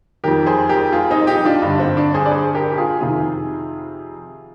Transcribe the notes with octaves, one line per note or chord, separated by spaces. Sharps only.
F2 D#3 G4 A#4
G#4 C5
G4 A#4
F4 G#4
C4 D#4
D#4 G4
D4 F4
G2 D3 D4
C4
D4
G#4 C5
D5
G#4 C5
G4 A#4
G4
F4 G#4
F2 C3 D#3 F4 G#4